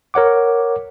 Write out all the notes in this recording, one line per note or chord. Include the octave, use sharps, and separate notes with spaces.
A#4 C#5 F#5 D6